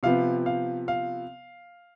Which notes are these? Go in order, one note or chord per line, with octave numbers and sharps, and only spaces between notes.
C3 F3 B3 F5
F5
F5